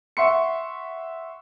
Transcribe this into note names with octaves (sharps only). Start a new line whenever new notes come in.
E5 F#5 C6 C#6 C#7